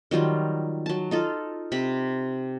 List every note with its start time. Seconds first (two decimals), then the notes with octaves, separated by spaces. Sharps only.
0.11 D#3 F#3 G3 F4
0.86 F#3 A5
1.11 D#4 F4 A4
1.72 C3 B5